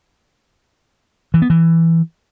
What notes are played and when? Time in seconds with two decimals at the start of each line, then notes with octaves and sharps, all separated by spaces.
1.34 E3
1.42 B3
1.50 E3